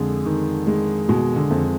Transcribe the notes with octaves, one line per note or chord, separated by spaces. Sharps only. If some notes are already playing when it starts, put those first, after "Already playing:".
Already playing: F2 D3 G#3
D#3
G#3
B2 G#3
D3
F2